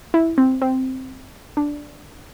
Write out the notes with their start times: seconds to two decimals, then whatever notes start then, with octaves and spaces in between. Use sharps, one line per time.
0.14 E4
0.38 C4
0.61 C4
1.57 D4